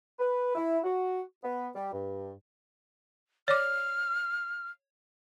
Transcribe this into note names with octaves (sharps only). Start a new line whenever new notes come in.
B4
E4
F#4
B3
G3
G2
C#5 D5 D6 F6